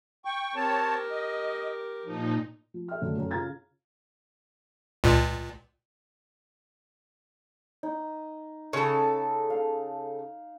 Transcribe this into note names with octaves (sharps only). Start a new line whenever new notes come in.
G5 C#6
C4 G4 A#4 C#5 A5
D#5
A#2 F3 D#4
F3
A4 E5 G5 F6
F#2 D3 F#3 A3
F#2 A4
C#3 F4 F5 A#5 G#6 A6
C#2 A#2
D#4
C#3 A4
F5